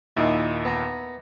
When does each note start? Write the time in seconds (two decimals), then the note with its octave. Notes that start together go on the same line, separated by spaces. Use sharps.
0.17 D#2 A#2 D#4 E4
0.65 B3 A#5